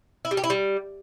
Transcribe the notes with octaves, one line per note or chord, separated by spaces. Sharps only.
E4
G3
G4
E4
G3